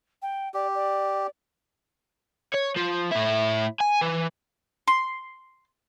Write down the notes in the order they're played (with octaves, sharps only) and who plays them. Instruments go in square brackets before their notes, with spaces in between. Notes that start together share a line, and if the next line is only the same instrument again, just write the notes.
[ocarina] G5
[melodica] G4 [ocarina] D5
[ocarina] D5
[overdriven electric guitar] C#5
F3
A2 E4
G#5
E3
[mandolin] C6